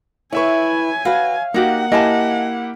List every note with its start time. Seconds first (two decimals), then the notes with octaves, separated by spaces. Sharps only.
0.32 E4 B4 C#5 E5 G#5 C#6
1.05 F#4 B4 F5
1.54 A#3 D#4 F#4 G4 F#5
1.92 A#3 E4 G4 D#5 G#5 A5